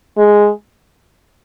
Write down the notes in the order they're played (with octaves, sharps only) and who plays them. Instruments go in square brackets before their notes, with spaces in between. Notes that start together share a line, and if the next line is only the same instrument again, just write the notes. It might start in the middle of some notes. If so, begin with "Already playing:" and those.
[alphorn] G#3